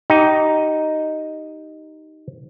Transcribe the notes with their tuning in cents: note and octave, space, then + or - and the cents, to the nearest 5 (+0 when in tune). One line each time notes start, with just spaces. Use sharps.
D#4 +0 G4 -20